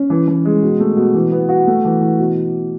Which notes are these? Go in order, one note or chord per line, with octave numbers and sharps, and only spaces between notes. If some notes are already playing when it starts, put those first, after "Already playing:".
Already playing: C#4
E3
E3
G#3
B2
A3
B2
E3
B3
F#4
A3
E3
E3
B2